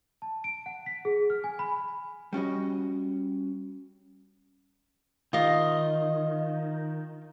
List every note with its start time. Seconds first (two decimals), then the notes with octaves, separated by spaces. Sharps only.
0.22 A5
0.44 D7
0.66 F#5
0.86 B6
1.05 G#4
1.30 F6
1.44 G#5
1.59 B5
2.33 G3 C#4 F#4 D#5
5.33 D#3 F4 D#5